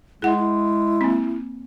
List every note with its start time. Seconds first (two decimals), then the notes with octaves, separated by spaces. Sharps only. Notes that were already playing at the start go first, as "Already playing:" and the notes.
0.22 G#3 E4 G#4 F#5
0.39 E4
1.01 A#3 C4